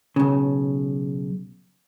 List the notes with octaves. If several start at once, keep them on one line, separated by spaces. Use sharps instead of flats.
B1 C#3